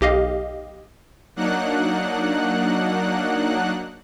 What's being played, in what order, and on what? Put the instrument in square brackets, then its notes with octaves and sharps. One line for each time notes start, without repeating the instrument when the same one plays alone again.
[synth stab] B1 G4 D#5 F5
[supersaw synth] F#3 A#3 D4 D#4 F#5 F#6